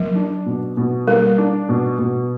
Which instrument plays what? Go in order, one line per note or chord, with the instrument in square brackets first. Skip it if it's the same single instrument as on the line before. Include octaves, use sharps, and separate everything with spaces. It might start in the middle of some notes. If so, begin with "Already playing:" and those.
Already playing: [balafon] F#3 [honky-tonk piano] A#3
[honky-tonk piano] D4
B2
B2
[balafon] G3 [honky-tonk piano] A#3
[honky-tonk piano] D4
B2
B2